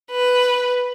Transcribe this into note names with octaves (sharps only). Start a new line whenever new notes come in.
B4